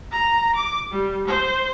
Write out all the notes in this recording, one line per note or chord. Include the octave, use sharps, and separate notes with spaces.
A#5
D6
G3
C5